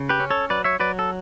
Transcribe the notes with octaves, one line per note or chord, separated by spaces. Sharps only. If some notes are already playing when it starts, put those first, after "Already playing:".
Already playing: C#3
G4 B4
C#4
A4 C#5
F#3 B4 D5
C#5 E5
F#3 B4 D5
A4